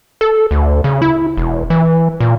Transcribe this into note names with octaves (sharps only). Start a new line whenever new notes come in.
A4
D2
C#3
E4
E1
E3
A#2